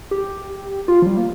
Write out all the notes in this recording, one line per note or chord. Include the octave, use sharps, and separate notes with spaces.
G4
F4
F3
G3
A#3